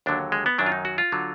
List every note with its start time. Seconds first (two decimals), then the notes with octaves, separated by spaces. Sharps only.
0.06 D#2 D3 F#3 D4
0.32 G#3
0.46 B3
0.58 F#2 D#3 F#3 D4
0.66 F4
0.72 D#4
0.85 F#4
0.98 F4
1.12 D3 F#3